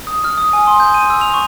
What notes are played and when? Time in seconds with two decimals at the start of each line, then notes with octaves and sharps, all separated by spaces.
0.07 D#6
0.24 F6
0.38 D#6
0.53 G#5
0.67 C6
0.80 G6
0.94 D#7
1.10 E6
1.21 F7
1.34 C#6